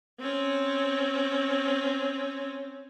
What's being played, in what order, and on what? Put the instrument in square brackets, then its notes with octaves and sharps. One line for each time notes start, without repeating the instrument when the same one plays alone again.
[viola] C4 C#4